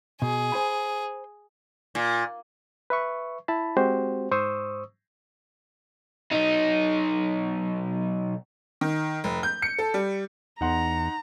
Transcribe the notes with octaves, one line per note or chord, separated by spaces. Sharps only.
B2 G#4
C5 G#5 B5
A#2
B4 E5 C#6
E4 A5 B5
G#3 C4 F#4 G4 C5
G#2 C5 C#6 D#6 E6
B1 D#4
D#3
F1
G6
C#7
A4
G3
E2 D#4 F#5 A#5 C6